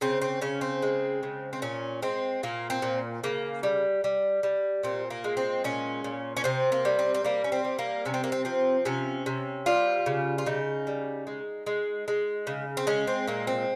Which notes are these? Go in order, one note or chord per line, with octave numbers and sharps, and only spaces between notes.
C#3 C4
C4
C#3 C#4
C4
G#3
C#3
C4
A#2 C#4
G#3 C4
A#2 A#3
C4
A#2
C#3 A#3
G3
G3
G3
A#2 C4
A#3
G#3
C4
A#2 C#4
A#2
C#4
C3 C4
A#3
G3
C4
C4
G3 A#3
C#4
C4
G3
A#3
C3 C#4
C4
A#3
C4
F3 C4
C3 C#4
C3
G3 F4
C#3
F4
C#3 D#4
G3
G#3
G#3
G#3
C#3
C4
G#3 C#4
C4
A#2 A#3
C4